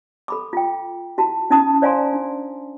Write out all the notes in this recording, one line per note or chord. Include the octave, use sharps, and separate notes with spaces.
A4 B5 D6
F4 G5
E4 F#4 A5
C#4 D#4 E4 A5 D#6
C5 D5 F5 G#5 A#5 C6
D4